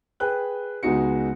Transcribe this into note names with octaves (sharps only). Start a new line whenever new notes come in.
G#4 B4 G5 F#6
C#2 G#3 B3 D#4 F#4 C#7